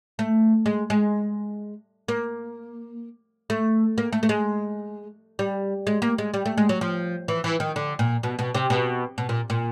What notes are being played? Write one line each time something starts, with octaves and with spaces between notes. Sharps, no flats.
A3
G#3
G#3
A#3
A3
A#3
A3
A3
G#3
G3
G#3
A#3
G#3
G3
A3
G#3
F#3
F3
E3
E3
D#3
D3
A#2
B2
B2
C3
B2
B2
A#2
A#2